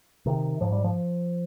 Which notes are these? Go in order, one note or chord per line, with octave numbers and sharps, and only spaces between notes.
C3 D#3
G#2 F3
G3
F3